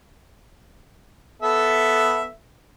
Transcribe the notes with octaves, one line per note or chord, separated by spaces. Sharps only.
B3 A4 E5